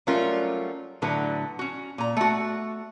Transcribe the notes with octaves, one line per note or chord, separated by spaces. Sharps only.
F#3 G3 A3 C#4 F4 A#4
A2 D3 F#3 B4
C#4 F#4
A#2 A#5
A3 F#4